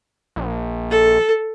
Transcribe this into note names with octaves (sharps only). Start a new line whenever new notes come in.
A#1
A4